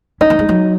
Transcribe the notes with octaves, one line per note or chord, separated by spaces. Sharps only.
C#4 D#4
A#3
G#3
F#3